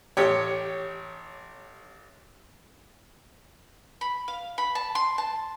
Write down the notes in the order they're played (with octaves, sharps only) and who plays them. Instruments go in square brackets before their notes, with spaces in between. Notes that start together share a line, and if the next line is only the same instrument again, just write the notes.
[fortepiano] A1 G4 C#5
[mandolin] B5
F5
B5
A5
C6
A5